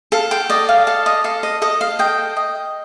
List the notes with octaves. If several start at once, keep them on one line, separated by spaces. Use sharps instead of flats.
A4 F5
G5
D5 D#5
F5
A4 F5
D#5
A4 F5
D#5
A4 D#5
F5
D#5 G5
D#5